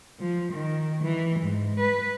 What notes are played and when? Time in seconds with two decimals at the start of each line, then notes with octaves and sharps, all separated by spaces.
0.20 F3
0.53 D#3
1.03 E3
1.40 G#2
1.80 B4